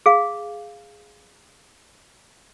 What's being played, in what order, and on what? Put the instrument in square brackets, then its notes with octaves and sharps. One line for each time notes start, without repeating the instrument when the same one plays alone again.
[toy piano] G#4 F5